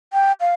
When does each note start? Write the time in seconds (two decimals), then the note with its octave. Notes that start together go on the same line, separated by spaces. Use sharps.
0.13 G5
0.40 F5